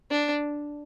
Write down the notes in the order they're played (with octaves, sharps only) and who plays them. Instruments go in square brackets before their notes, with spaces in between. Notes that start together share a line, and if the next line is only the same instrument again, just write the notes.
[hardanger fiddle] D4